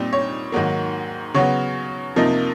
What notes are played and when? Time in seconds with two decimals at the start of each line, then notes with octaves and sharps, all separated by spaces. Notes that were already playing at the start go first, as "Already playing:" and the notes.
Already playing: A#2 G3 C4 D#4
0.13 C#5
0.52 G#2 D#3 F#3 A#3
1.34 C#3 F#3 B3 C#5
2.16 C3 F3 A#3 D#4